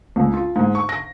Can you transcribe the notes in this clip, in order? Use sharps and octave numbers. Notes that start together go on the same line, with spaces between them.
C#2
F4
G#2
C#6
A#6